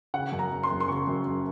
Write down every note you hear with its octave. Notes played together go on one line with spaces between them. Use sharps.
C#3 F#5
F#2
A#5
F#1
C6
F#1
C6
C#3 C#6
F#2
F#1